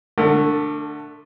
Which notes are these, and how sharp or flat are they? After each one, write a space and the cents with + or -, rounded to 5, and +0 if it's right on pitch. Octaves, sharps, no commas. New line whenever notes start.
D3 +10 A3 +0 A#4 -45